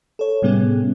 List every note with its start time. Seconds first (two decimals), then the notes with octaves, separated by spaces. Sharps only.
0.19 A4 C#5
0.42 A2 C3 G3 B3 C#4 G#4